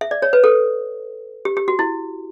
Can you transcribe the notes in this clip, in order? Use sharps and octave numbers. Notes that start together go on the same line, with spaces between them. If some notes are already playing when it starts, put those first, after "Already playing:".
E5
D5
C#5
B4
A4
G4
G4
F#4
E4